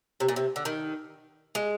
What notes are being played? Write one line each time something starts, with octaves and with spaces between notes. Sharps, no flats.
C3
A#2
C3
D3
D#3
G#3